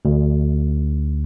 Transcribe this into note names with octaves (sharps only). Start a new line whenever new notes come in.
D2